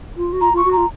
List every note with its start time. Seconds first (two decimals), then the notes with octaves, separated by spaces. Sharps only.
0.17 F4
0.33 F#4
0.41 F4 A#5
0.53 F4
0.57 C#6
0.65 F#4
0.73 F4 A#5